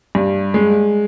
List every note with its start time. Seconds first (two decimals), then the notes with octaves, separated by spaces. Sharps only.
0.15 G2
0.54 G#3